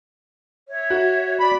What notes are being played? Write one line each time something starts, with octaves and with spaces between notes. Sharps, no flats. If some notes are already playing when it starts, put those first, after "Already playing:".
C#5 E5
F#4
D5 B5